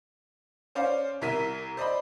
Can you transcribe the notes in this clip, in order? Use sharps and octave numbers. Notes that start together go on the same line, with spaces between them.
C#4 C5 D5 F5
C2 E4 A#4 B6 D#7
C5 D5 D#5 B5